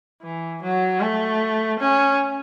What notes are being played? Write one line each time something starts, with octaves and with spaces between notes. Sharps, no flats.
E3
F#3
A3
C#4